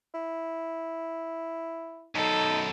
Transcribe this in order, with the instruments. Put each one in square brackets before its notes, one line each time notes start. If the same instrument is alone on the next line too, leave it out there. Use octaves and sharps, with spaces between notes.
[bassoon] E4
[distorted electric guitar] F#2 B2 [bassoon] D#4 [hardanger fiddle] A4